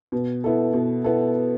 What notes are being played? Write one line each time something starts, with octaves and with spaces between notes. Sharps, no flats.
B2
B3 E4 A4
B2
B3 E4 A4